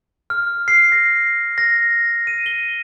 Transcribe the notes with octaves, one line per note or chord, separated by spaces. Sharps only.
F6
C7
A#6
A#6
D#7
G7